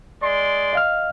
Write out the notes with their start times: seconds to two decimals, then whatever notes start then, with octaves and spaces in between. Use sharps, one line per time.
0.23 G#3 D5 C6
0.73 D#5 F5 F6